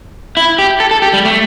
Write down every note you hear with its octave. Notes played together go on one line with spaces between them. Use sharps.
E4
G4
A4
A4
G4
G3
A3